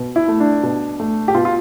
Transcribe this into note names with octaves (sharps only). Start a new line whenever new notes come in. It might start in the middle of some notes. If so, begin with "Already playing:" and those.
Already playing: B2
E4
A3
D4
B2
A3
G4
B2 F4
F4